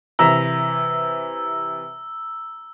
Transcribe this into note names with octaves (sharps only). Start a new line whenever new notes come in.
C3 E3 E5 A#5 E6